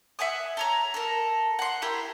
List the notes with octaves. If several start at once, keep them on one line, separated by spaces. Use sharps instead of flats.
E5 F#5 G#5 D#6
A4 C#5 A#5
A4 A#4
F#5 C6
E4 G4 A#4 G6